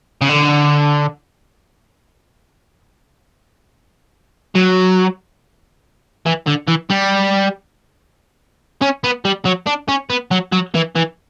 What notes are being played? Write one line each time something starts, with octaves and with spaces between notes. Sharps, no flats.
C#3
D3
F#3
E3
D3
E3
G3
C#4
B3
G3
F#3
D4
C#4
B3
F#3
F#3
E3
E3